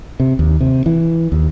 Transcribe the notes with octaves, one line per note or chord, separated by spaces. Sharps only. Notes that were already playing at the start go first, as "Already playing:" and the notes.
C3
D#2
C3
E3
D#2